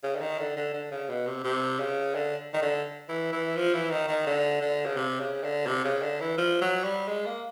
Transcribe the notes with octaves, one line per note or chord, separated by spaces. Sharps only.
C#3
D3
D#3
D3
D3
D3
C#3
B2
C3
C3
C#3
D3
D#3
D3
E3
E3
F3
E3
D#3
D#3
D3
D3
C#3
C3
C#3
D3
C3
C#3
D3
E3
F3
F#3
G3
G#3
A#3